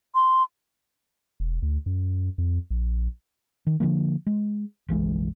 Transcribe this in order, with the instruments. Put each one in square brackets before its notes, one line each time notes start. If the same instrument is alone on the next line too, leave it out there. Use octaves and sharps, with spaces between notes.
[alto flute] C6
[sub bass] E1
D2
F#2
F2
A#1
[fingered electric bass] D#3
D3 E3 F3 A#3
G#3
F#1 B1 E3 G#3